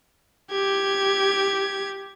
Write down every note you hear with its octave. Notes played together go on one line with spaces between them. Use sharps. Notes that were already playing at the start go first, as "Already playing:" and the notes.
G4 G#6